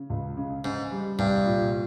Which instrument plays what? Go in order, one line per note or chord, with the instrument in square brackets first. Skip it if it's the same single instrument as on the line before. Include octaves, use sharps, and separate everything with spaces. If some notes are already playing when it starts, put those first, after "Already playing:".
Already playing: [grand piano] C#3
C#2
C#3
[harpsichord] G#2 [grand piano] C#3
[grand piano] G3
[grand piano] C2 [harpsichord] G2
[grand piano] A#2